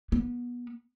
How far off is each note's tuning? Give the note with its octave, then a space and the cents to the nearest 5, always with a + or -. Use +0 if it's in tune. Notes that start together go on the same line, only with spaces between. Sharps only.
B3 -25